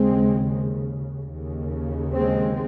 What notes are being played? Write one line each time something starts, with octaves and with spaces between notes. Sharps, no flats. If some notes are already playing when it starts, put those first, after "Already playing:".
Already playing: D#2 C#3 G#3 C4
D#2 C#3
G#3 C4